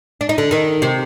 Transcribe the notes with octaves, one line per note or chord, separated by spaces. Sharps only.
D4
D#4
D3 D4
D#3 D#4
C3 C4